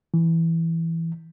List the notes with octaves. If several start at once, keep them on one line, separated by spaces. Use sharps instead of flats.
E3